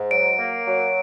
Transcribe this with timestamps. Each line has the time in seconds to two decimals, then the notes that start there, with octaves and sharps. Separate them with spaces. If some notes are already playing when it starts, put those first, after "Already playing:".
Already playing: G#2
0.11 F#3 D7
0.39 A#3
0.67 F#3